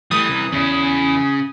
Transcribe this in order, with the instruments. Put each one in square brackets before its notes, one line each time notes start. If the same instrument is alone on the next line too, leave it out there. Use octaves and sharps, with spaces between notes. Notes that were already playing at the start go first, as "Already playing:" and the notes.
[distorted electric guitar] E3 [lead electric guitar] G3 A3 [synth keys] D#6
[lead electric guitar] C2
[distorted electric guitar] E2 E4 [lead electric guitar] C#3 C#4